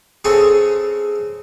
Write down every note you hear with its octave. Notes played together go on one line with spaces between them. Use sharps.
C#3 C4 C#4 G#4 A4 C#5